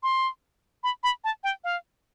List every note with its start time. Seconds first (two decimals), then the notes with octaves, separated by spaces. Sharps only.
0.03 C6
0.84 B5
1.03 B5
1.24 A5
1.44 G5
1.64 F5